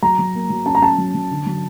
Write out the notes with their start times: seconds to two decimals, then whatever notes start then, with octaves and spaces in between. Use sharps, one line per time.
0.03 F#3 A#5
0.19 F#3
0.35 A#3
0.50 F#3
0.66 C#4 A5
0.75 A#5
0.82 C#4 A5
0.98 F#3
1.14 F#3
1.31 D3
1.46 F#3